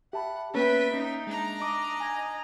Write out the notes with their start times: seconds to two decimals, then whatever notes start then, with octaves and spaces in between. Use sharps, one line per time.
0.13 G4 E5 F#5 A5 B5
0.54 A#3 B3 C#4 B4 E5 G5 A6
0.94 C#4 D#4
1.27 G#3 D4 A#5
1.62 D#5 D6
2.00 G#5 G#6